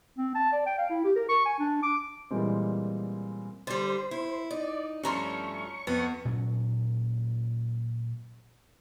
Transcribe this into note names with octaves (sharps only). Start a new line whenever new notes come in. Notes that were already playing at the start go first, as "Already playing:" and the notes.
C4
A5
D5
G5
F5
E4
G4
A#4
C#6
G#5
D4
D6
A#2 E3 G3 G#3 C4
D3 G3 C5
E4
D#4 D5
G2 F3 A3 C#4 A#5 C6 C#6
F2 B3
A#2 F#3 C#4